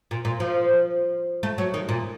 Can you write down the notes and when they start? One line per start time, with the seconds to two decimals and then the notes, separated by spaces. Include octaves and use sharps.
0.11 A#2
0.25 A#2
0.40 F3
1.43 A3
1.58 F#3
1.74 D#3
1.89 A#2